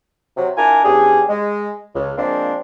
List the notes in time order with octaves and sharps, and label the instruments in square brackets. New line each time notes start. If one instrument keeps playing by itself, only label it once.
[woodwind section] C3 F#3
D4 E4 F4 A#4 G#5
E2 C#4 D4 G4 G#4
G#3
C#2
F3 G#3 A#3 C4 D4